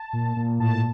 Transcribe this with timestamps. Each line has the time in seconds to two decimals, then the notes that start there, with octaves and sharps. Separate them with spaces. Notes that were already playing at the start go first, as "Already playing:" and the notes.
Already playing: A5
0.13 A#2
0.36 A#2
0.59 A2 A5